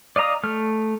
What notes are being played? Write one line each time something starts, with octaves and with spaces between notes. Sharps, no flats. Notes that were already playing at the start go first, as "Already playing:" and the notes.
D5 D#5 F5 A#5 D#6
A3 F6